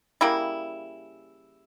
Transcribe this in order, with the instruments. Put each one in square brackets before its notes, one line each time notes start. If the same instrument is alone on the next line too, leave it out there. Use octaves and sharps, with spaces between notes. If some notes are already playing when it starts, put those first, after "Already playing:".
[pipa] C#3 G3 A#3 E4